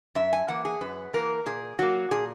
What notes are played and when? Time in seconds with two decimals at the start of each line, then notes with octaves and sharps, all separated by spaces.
0.15 F#2 E5
0.33 G#5
0.48 E3 A#3 F#5
0.65 G#4
0.81 F#2 B4
1.13 E3 A#3 A#4
1.46 A#2 G#4
1.79 F#3 A#3 F#4
2.11 A#2 G#4